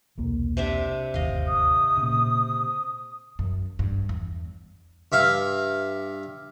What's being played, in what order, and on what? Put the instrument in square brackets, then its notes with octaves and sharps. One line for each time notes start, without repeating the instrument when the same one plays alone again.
[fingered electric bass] E1 C2 A#3
[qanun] C3 D4 E5
[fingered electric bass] D1 G1 D#2 [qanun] D#5 F5
[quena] D#6
[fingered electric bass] A#2 C#3
[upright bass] F#2
G2
E2
[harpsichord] G2 E5 F5